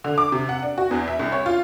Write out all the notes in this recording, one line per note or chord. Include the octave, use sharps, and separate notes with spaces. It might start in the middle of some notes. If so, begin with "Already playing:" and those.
D3
D6
C3
F#5
D4
F#4
E2
E5
C2
C#5
F4